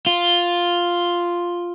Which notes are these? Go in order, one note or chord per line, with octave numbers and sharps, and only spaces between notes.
F4